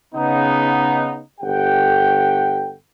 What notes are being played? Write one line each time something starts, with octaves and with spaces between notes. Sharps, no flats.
C#3 B3 D#4
G1 G4 A4 F#5 G5